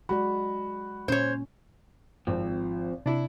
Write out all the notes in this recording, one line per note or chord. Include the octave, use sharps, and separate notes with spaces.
F#3 G#3 F#4 D5 B5
A#2 C#4 C5 C#5
G#1 F3 C4
C3 D4 E4